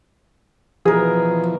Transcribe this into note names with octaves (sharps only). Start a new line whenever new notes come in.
B2 E3 F3 G#4 A#4